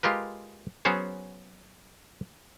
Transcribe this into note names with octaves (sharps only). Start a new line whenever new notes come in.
G#3 F4 G4 A#4 B4
F#3 B3 C#4 G#4 C5 C#5